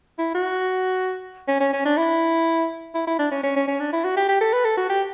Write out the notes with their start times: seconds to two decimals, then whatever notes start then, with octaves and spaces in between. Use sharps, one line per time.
0.19 E4
0.35 F#4
1.48 C#4
1.60 C#4
1.73 C#4
1.85 D4
1.97 E4
2.94 E4
3.07 E4
3.19 D4
3.31 C#4
3.43 C#4
3.56 C#4
3.68 C#4
3.80 D4
3.93 E4
4.04 F#4
4.17 G4
4.29 G4
4.41 A4
4.53 B4
4.65 A4
4.77 F#4
4.90 G4